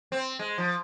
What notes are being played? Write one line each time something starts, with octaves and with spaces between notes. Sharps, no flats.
C4
G#3
F3